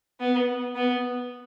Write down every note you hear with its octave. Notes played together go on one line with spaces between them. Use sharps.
B3
B3